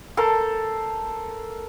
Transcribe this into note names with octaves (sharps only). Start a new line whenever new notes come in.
A4 A#4 C5 A5